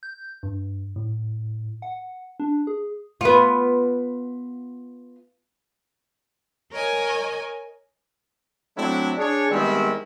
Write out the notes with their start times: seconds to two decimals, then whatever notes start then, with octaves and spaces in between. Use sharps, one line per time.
0.03 G6
0.43 G2
0.96 A2
1.82 F#5
2.40 D4
2.67 G#4
3.21 B3 F4
6.72 A#4 C#5 D#5 G#5
8.77 F#3 A3 C4 D4 E4
9.18 D4 G#4 C#5
9.49 D#3 G3 G#3 B3 C4 E4